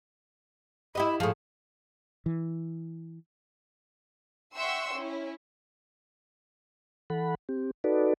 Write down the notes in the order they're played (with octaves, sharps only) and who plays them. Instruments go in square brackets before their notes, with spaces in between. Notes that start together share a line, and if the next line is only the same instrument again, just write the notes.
[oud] E4 G4 D#5 [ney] B5
[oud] A2 F3 [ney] G#4
[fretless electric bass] E3
[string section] E5 F#5 G5 C6 C#6 E6
C#4 E4
[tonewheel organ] E3 A4 F#5 B5
C4 G4
D#4 F#4 A4 B4 D5